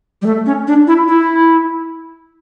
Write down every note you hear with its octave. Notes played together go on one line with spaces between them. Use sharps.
G3
A3
C#4
D4
E4
E4